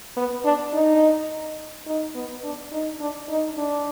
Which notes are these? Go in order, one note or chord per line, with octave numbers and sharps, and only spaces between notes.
B3
D4
D#4
D#4
B3
D4
D#4
D4
D#4
D4